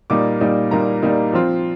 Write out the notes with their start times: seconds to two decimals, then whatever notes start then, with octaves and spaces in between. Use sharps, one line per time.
0.10 A#2 G3 A#3 D#4 D6
0.41 A#2 G3 A#3 D#4
0.71 A#2 G3 A#3 D#4 A#5
1.03 A#2 G3 A#3 D#4
1.33 F3 C4 F4